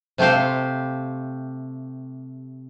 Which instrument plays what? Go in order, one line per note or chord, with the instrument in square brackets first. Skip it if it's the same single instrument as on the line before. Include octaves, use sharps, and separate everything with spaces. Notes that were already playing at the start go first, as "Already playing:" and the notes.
[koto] C3 A3 G4 C5 F5